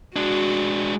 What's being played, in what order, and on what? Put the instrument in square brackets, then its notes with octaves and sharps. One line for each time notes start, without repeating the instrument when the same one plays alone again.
[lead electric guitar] G#3 D4 [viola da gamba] F#4